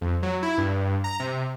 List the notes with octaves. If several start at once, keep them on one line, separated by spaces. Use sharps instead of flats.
F2
F#3
E4
G2
A#5
C3